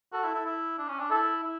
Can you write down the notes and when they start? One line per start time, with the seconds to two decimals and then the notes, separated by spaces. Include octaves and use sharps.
0.12 F#4 A4
0.24 E4
0.34 E4
0.45 E4
0.78 D4
0.89 C#4
1.00 D4
1.11 E4 A4
1.43 E4